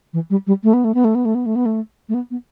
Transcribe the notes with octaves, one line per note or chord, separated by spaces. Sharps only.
E3
G3
G3
A3
B3
A3
B3
A3
B3
A3
B3
A3
B3
A3
A3
B3
B3